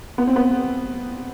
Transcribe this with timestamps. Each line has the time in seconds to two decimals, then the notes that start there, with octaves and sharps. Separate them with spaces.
0.18 B3
0.27 C4
0.36 B3